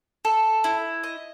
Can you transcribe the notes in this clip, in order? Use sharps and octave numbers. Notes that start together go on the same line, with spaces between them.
A4
E4
D#5